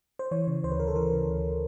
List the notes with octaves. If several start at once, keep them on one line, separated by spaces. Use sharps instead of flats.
C5
E3 C#5
C#3
D2 C5
B4
D2 A#4
A4
E3 A#4
C#3
D2